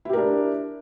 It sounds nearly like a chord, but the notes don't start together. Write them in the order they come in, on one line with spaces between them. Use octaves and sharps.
E4 G4 A#4 D4